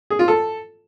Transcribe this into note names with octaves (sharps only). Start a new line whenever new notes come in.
G#4
F4
A4